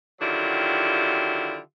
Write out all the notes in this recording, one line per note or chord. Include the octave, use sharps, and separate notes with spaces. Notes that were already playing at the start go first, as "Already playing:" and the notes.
D3 D#3 F#3 E4 F4 G4